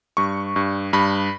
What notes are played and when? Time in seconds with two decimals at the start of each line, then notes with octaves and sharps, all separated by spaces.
0.17 G2 C#6
0.56 G2
0.93 G2 B5